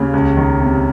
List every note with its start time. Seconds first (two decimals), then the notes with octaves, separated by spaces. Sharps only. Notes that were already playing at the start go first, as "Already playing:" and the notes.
Already playing: D#2 C#3
0.13 C#2
0.37 D#3
0.61 C3